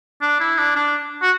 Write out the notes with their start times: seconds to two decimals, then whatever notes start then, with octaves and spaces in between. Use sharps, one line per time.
0.22 D4
0.40 E4
0.58 D4
0.76 D4
1.22 F#4